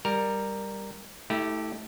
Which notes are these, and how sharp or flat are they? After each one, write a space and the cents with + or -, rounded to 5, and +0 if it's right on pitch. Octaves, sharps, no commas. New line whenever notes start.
G3 +10 A#4 +0
A3 +0 E4 -40 G4 +0